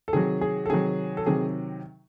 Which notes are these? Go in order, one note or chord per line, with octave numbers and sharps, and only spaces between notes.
A4
C3 D#3 F#3 G#4
G#4
A4
C3 D#3 F#3 G#4
A4
C3 D#3 F#3 G#4